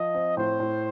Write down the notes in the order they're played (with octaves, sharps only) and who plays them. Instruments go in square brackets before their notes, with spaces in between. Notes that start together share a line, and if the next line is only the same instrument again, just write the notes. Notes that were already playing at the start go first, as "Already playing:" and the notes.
Already playing: [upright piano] F3 [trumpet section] D#5
[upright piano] C4
[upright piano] A2 [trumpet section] C5
[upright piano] A2